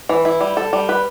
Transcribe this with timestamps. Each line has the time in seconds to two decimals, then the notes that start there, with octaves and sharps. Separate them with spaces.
0.09 E3
0.25 E4
0.41 G3
0.57 A4
0.73 G3
0.89 B4